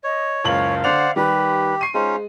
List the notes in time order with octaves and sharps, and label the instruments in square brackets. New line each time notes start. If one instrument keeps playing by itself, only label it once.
[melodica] C#5 [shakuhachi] D#5
[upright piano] F#1 C#2 F#7 [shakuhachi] F5
[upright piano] D3 F7 [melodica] C5 D5 F#5
[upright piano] D#3 G3 [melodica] G4 [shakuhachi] B4
[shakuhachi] C#6 [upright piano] C7 D#7
[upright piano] G#3 [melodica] C#4 D#4 F4 [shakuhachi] C5